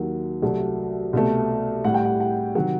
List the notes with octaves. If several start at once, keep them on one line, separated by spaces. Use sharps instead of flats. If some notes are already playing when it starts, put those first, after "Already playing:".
Already playing: D#2 D#3 F#3
C2 C3 F#3 A3
C2 B2 A3
A2 G3 F#5
G5
F#5
F#5
C3 D#3 F#3 F#5